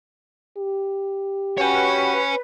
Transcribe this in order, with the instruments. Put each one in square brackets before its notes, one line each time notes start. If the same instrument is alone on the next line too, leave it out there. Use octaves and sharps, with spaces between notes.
[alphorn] G4
[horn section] C#4 F#4 G5 [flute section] B4 [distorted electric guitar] C#5 G#5